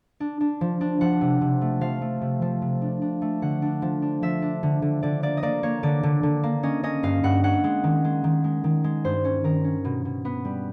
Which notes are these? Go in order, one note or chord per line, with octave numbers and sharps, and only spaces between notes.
D4
D4
F3
D4
F3 F#5
C3
C3
A3
F3 F5
A3
C3
F3
C3
D4
D4
A3
D3 F#5
D4
F3
D4
F3 E5
D4
D3
D3
D3 D5
A#3 D5
D#5
A#3 D5
A#3 C#5
D3 D5
D3
D3
A#3
C#4 D#5
C#4 D#5
G2 F5
G2 F#5
C#4 F#5
G#3
D#3
G#3
D#3
G#3
D#3
G#3
G2 C5
C#4
D#3 A#4
C#4
B2
B2
B3
G3